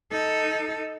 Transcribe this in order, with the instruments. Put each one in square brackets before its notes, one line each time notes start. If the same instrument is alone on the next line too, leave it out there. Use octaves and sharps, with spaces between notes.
[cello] D#4 A4